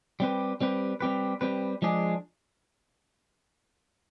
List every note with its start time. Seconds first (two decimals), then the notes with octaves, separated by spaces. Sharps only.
0.20 G3 C4 G4 B4
0.61 G3 C4 G4 B4
1.01 G3 C4 G4 B4
1.41 G3 C4 G4 B4
1.82 F3 G#3 D4 G#4